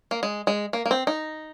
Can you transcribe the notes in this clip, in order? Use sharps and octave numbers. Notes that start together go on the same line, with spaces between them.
A#3
G#3
G#3
A#3
A#3
C4
D#4